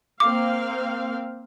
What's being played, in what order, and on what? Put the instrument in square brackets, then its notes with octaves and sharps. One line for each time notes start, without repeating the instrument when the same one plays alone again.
[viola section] A#3 C4 F5 [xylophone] D6